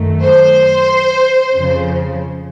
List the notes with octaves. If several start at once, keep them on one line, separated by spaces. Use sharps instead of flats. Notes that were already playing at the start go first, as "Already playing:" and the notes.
Already playing: F#2 D#3 A3
C5
F2 C#3 F3